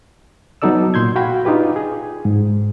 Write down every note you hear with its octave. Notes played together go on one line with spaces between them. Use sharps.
F#3 B3 D#4 A4 D5 E6
A#2 C6 G6 G#6
F#4 F5 G5 B5
D4 D#4 F4 G4 B4
G#4
G#2